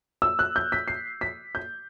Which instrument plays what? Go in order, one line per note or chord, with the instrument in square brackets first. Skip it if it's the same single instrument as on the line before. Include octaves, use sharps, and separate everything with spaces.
[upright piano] E6
F#6
G6
B6
C7
B6
G6